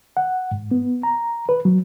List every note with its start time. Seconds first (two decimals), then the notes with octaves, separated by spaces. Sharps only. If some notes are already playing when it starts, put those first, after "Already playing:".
0.17 F#5
0.51 G#2
0.71 B3
1.03 A#5
1.49 B4
1.65 F#3